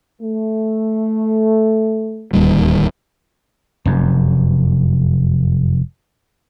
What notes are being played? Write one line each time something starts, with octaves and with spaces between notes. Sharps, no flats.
A3
D1 D#2 G3
F1 F#2